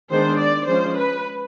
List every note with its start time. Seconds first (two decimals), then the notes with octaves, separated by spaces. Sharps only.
0.11 D#3 G#3 B3 D4 C5
0.39 D5
0.68 F3 G#3 C#4 C5
0.97 B4